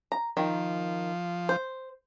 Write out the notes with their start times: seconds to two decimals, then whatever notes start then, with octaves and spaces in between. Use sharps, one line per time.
0.12 A#5
0.37 D#3 F3
1.49 C5